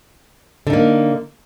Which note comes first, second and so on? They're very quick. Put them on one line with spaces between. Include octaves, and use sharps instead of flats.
D3 D#4 A#3